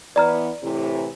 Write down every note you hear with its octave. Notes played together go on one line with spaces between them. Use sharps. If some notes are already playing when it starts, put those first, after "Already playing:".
E3 B3 D5 A#5 F6
A2 C3 E3